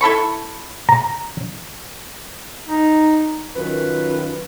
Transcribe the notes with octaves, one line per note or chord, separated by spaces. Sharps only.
E4 A4 B5 C#6
A#5
D#4
F#2 D#3 F4 B4